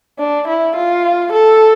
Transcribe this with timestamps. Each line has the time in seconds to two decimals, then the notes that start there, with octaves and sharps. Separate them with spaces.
0.19 D4
0.48 E4
0.76 F4
1.33 A4